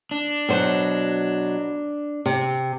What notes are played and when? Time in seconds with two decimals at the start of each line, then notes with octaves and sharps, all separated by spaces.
0.11 D4
0.49 B2 F#3 C5
2.26 C3